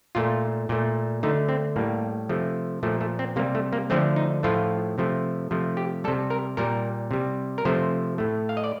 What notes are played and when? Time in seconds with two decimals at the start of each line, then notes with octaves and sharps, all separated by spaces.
0.15 A#2 A3 F4
0.69 A#2 A3
1.23 D3 A3 D#4
1.49 C4
1.76 A2 G3 A#3
2.29 C3 F3 A3
2.83 A#2 F3 A3
3.01 A3
3.19 C4
3.36 C3 A#3
3.39 G3
3.55 A3
3.73 A#3
3.90 D3 F3 A3 C4
4.16 D#4
4.43 A2 F3 A3 F4
4.98 C3 F3 A3
5.51 C3 F3 A3
5.77 G4
6.04 G3 A4
6.08 C3
6.30 A#4
6.57 A#2 G3 A#4
7.11 C3 G3
7.58 A#4
7.65 C3 F3 A3 C5
8.18 A2 A3
8.49 F5
8.57 D#5
8.64 D5